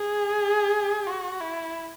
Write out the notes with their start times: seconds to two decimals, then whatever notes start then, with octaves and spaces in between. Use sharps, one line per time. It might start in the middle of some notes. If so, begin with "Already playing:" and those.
Already playing: G#4
1.07 F#4
1.41 E4